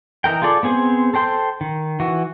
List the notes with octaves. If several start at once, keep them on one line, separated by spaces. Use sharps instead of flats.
E3 D#4 A#4 G5
F4 G#4 A4 D5
B3 C4 G#4 C5
A4 C5 G5 C6
D#3
E3 F#4